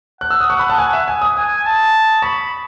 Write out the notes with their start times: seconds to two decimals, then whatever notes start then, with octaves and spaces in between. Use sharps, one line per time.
0.21 F#5 F#6
0.30 E6
0.41 D#6
0.50 C#6
0.59 B5
0.70 A5
0.78 G#5
0.93 E5
1.08 G#5
1.22 D#6
1.37 G#5 D#6
1.65 A5
2.22 B5 C#6